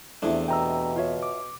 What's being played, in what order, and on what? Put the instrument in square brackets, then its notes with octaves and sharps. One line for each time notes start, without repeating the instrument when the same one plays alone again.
[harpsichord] E2 C3 A3 [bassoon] F3 [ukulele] D4 E4
[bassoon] B2 [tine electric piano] G5 A#5 E6
[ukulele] F4 C#5 E5
[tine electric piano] D6